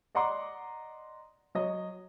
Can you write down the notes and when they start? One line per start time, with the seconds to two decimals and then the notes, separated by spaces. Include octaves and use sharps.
0.15 D5 D#5 F#5 A#5 C6 D6
1.55 F#3 D#5